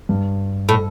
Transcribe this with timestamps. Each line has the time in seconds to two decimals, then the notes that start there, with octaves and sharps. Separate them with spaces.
0.09 G2
0.69 A2